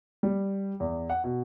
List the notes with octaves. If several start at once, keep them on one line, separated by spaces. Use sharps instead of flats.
G3
E2
F#5
B2